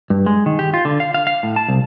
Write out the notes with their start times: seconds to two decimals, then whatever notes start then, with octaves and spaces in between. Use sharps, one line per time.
0.10 G2
0.26 G#3
0.46 D#3
0.59 G4
0.74 F4
0.85 D3
1.00 F5
1.14 F5
1.27 F5
1.43 A2
1.56 A5
1.69 C2